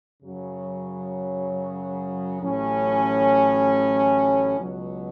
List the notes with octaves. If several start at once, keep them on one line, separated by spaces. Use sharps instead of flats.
F#2 C#3 F#3
A1 A2 F#3 C#4
C#2 B2 F#3